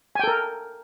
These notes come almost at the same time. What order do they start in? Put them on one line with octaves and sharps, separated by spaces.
G#5 G5 A4 A#4